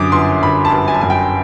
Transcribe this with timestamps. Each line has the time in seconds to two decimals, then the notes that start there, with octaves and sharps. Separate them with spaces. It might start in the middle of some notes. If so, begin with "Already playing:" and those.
Already playing: F#2 D3 D6 D#6
0.12 G1 C6
0.43 G1 B5
0.65 A5
0.72 G1
0.88 G#5
0.94 A5
1.01 F#2 G#5
1.10 G5